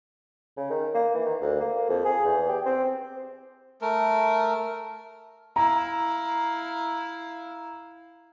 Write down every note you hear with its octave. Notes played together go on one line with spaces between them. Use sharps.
C#3
D#3
A#3
E3
D#3
D2
A#3
F2
G#4
E2
G4
C4
A3 A#4
E4 F5 A#5